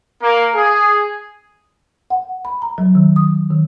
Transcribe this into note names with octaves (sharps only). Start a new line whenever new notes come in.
A#3
G#4
F#5
B5
A#5
F#3
D#3
D#6
D#3